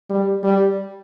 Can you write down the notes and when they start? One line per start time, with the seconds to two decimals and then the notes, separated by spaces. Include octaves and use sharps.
0.10 G3
0.44 G3